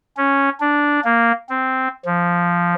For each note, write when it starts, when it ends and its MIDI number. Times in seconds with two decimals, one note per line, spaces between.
0.17 0.49 61
0.60 1.00 62
1.05 1.32 58
1.50 1.88 60
2.05 2.75 53